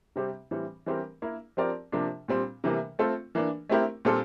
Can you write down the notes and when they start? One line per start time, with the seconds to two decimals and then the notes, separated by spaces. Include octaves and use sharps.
0.16 C3 G3 C4 G4 C5
0.51 A2 E3 G3 C4
0.86 E3 G3 C4 G4 A#4
1.22 A#3 E4 A#4
1.57 F3 C4 G4 A#4 D5
1.92 C3 F3 A#3 D4
2.28 A#2 G3 C4
2.64 C3 E3 G3 A#3
2.99 A3 C4 F4 A4
3.35 E3 A#3 D4
3.69 A3 C4 E4 G4 A#4
4.05 A#2 G3 C4 F4 A4